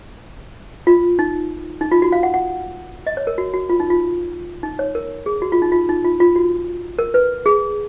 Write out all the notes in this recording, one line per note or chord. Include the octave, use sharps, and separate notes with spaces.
F4
D#4
D#4
F4
F#4
F5
F#5
F#5
D#5
C#5
A#4
F#4
F#4
F4
D#4
F4
D#4
C#5
A#4
G#4
F#4
F4
D#4
F4
D#4
F4
F4
F#4
A#4
B4
G#4